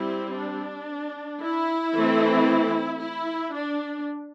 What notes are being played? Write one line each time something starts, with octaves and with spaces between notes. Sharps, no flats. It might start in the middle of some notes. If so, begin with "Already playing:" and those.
Already playing: G3 C4 E4
D4
E4
E3 A3 C4
E4
D4